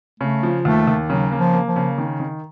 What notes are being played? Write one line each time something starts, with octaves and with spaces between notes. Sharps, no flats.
C#3 A3
F3
D#2 A3
D#2
C#3 F#3
A#3
F3
A#3
F3
C#3
D#3
D#3